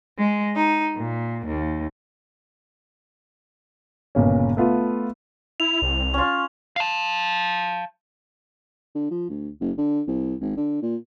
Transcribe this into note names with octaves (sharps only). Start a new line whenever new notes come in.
G#3
D#4
A#2
D#2
G1 A#2 C#3 C#4
A3 B3 F4
E4 F7
C2
C#4 F4
F5 A5
D3
F3
D2
F#1
D3
C2
G#1
D3
A#2